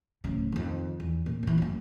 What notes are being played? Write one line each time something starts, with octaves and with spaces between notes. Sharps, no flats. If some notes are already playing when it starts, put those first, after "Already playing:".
D1 C#3
F2 D#3
E2
A#2
F#2 E3
F#2 A#3